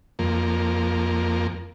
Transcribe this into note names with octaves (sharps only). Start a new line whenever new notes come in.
F2 A#3